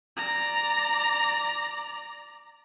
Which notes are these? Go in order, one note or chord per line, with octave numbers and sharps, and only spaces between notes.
D5 A#5